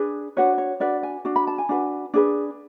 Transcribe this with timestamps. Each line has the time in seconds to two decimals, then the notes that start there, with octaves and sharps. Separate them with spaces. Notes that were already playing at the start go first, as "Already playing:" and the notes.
Already playing: D4 G#4 B4
0.37 D4 F#4 B4 C#5
0.58 C#5
0.80 D4 F#4 B4 D5
1.03 G#5
1.25 D4 F#4
1.36 B5
1.47 A5
1.58 G#5
1.69 D4 F#4 B4
2.14 D4 G#4 B4